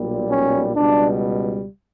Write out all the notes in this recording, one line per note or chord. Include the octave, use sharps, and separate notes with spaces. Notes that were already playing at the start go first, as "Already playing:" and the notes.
Already playing: B1 A#2 G3
C#4
C#2 B2 G3 D4